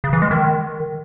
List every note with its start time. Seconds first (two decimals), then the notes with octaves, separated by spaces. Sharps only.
0.04 C#3
0.13 E3
0.22 G#3
0.31 D#3